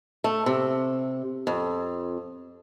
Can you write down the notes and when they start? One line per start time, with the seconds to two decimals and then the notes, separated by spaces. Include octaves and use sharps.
0.24 A3
0.46 C3
1.47 F2